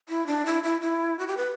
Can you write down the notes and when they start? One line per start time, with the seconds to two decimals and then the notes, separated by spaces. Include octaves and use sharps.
0.09 E4
0.27 D4
0.46 E4
0.63 E4
0.81 E4
1.19 F#4
1.27 G4
1.37 B4